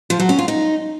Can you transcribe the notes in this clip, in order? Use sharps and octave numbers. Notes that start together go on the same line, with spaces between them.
F3
F#3
C#4
F4
D#4